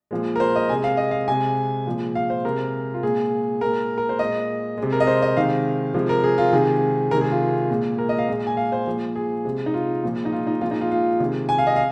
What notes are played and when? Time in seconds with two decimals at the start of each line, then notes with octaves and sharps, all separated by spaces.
0.11 A#2 F3 G#3
0.36 A#4
0.40 C5
0.55 D#5
0.69 C3 G#3 G#5
0.84 F5
0.97 D#5
1.11 F5
1.28 C3 G#3 G#5
1.86 A#2 F3 G#3
2.15 F5
2.30 C5
2.45 C3 G#3 A#4
2.94 F4
3.03 A#2 G#3 G#4
3.61 A#2 G#3 A#4
3.98 A#4
4.09 C5
4.19 A#2 G#3 D#5
4.78 G#3
4.83 C3
4.92 A#4
5.00 D#5
5.07 C5
5.22 D#5
5.36 C3 D#3 G#3 F5
5.94 C3 F3 G#3
6.09 A#4
6.24 G#4
6.38 F4
6.53 C3 D#3 G#3 G#4
7.11 C3 D#3 G#3 A#4
7.21 G#4
7.31 F4
7.70 A#2 G#3
7.98 A#4
8.09 D#5
8.18 F5
8.29 A#2 G#3
8.47 G#5
8.57 F5
8.72 C5
8.86 A#2 F3 G#3
9.15 G#4
9.45 C3 G#3
9.66 D#4
9.74 F4
10.04 A#2 F3 G#3
10.25 D#4
10.32 F4
10.47 D#4
10.61 A#2 F3 G#3 F4
10.71 D#4
10.81 F4
10.91 F4
11.20 C3 D#3 G#3
11.49 G#5
11.58 F5
11.67 D#5
11.76 F5